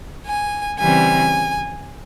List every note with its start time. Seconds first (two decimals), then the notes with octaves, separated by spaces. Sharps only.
0.26 G#5
0.79 C#3 E3 G3 C4 G#5